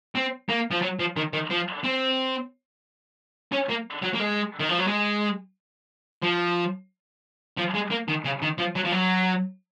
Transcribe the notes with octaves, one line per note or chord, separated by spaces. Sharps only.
C4
A#3
F3
F#3
F3
D#3
D#3
F3
C4
C#4
A#3
F#3
A#3
G#3
D#3
F3
F#3
G#3
F3
F3
G#3
A#3
D#3
C#3
D#3
F3
F#3
F3
F#3